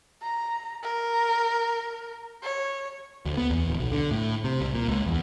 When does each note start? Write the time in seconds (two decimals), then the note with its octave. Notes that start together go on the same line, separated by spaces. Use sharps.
0.22 A#5
0.83 A#4
2.43 C#5
3.26 D2
3.37 B3
3.51 E2
3.68 D1
3.80 B1
3.92 D3
4.11 A2
4.44 C3
4.61 C2
4.74 A#2
4.88 C#2
5.07 E2